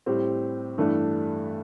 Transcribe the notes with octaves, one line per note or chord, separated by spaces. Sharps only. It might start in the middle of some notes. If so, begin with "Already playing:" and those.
A2 G3 C4 G4
G2 E3 A3 D4